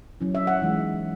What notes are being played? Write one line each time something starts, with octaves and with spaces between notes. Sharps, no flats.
F#3 C#4 E4
E5
F#5
E3 G#3 D#4